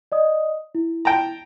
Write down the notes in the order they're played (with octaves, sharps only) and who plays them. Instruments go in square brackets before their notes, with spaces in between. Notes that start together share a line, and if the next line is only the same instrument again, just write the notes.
[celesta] D5 D#5 D#6
E4
[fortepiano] G5 A5 A#5